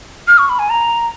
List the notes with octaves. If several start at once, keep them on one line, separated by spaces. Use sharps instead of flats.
F6
C#6
B5
G#5
A#5